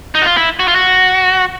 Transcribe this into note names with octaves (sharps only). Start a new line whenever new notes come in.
D#4
F#4
F4
E4
F#4
F4
F#4